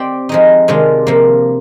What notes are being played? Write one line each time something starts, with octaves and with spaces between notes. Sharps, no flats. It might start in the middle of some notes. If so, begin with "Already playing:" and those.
Already playing: C4 G4 D5
F3 G#3 D#4
C3 D#3 G#3 D4 F4
C3 F3 A#3